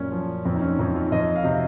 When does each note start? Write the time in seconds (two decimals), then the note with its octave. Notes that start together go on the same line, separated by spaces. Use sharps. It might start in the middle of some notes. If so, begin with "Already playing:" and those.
Already playing: F#2 A#2 C#4
0.12 F3
0.45 F2 C4
0.55 D#4
0.61 C#4
0.79 F2 D#4
0.95 F4
1.12 F2 D#5
1.36 F5
1.44 C3 D#5